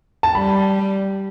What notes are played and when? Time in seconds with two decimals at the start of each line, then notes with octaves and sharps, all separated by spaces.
0.23 A5
0.35 G3 B5